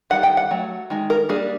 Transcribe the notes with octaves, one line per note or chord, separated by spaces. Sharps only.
D#3 G3 F#5
G5
F#5
F#3 A3
D#3 G#3
A#4
G3 A#3 D4 G#4